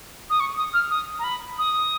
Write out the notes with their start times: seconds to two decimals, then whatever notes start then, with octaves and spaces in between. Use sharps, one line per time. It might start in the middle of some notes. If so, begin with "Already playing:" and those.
0.30 D#6
0.40 C#6
0.57 D#6
0.74 F6
0.90 D#6
1.19 A#5
1.24 B5
1.59 D#6